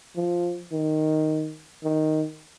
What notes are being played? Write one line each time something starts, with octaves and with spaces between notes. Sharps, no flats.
F3
D#3
D#3